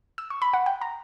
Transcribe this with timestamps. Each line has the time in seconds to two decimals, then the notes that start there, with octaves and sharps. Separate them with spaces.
0.18 E6
0.30 C#6
0.42 B5
0.53 F#5
0.66 G5
0.81 A#5